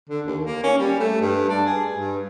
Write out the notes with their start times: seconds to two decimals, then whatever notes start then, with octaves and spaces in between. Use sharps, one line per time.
0.09 D3
0.26 D#2
0.45 A#3
0.63 C#4
0.79 G3
0.99 A3
1.21 G2
1.49 D4
1.66 G#4
1.95 G2